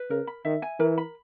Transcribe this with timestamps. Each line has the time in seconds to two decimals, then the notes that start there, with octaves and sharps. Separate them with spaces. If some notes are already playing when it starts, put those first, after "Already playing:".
Already playing: B4
0.10 C#3 A#4
0.27 B5
0.45 D#3 E5
0.62 G#5
0.80 E3 A#4
0.98 B5